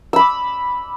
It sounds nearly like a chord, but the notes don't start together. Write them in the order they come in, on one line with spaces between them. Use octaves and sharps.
E6 B5 D6